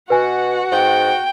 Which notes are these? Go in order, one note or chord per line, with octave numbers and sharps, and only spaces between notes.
B2 F#4 B4 F#5 G#5
G#2 G5